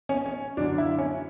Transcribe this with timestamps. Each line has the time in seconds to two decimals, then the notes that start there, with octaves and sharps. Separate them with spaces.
0.09 C#4
0.26 C#4
0.57 F#2 D3 D4
0.78 E4
0.98 C#4